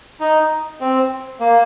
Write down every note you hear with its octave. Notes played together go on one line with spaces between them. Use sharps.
D#4
C4
A#3